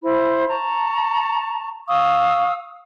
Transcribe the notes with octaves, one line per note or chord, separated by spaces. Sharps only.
E4 C5 B5
A5 A#5 C#6
F5 C#6 D#6 E6